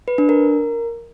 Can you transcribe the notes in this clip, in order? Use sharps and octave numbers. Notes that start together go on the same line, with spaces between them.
B4
D4
A#4